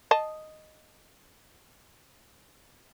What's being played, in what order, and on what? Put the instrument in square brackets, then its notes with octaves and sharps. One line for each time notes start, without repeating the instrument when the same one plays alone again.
[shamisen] D#5 A5